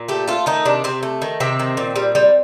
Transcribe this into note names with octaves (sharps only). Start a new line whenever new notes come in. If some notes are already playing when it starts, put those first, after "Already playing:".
Already playing: A#2
A3 G4
A3 F4
D#3 D#4
C3 D4
C3 C4
A3
D#3
C3 C4
D#3
A#2
G3
G3